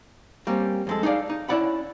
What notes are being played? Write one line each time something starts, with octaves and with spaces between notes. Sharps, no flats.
G3 A#3 C4 C#4
F2 G#3 A4
D#4 G#4 C#5 D5 F5
D#4
C#4 E4 C#5 D5 F#5 B5